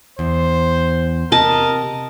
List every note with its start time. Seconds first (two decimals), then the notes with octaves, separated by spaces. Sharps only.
0.19 E2 C5
1.32 C3 A#4 D#5 A5